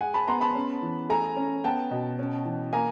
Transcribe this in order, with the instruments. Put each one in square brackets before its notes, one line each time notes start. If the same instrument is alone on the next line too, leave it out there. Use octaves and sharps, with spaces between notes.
[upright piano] G#3 F#5 G#5
A5 B5
B3 A#5 C6
A5 B5
C#4
E3
A3 G#5 A#5
C#4
B3 G5 A5
B2
C#4
E3
A#3 G#5 A#5